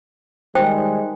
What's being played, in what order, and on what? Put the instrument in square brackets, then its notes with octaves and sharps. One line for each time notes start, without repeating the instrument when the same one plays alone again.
[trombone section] D#3 G3 G#3 [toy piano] C5 G5